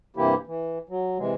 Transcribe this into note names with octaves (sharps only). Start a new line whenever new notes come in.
G2 C3 E3 A#3 E4 G4
E3
F#3
C3 E3 G#3